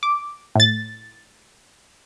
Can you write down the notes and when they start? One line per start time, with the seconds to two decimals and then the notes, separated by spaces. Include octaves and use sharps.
0.03 D6
0.55 A2 A6